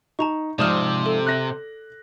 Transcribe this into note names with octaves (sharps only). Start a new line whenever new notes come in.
D#4 A5 A#5 C#6
G#2 C3 F3 D5 D#6 F6
A4
F#6 A#6